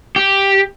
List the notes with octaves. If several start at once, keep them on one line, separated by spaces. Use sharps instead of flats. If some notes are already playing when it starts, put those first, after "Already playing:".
G4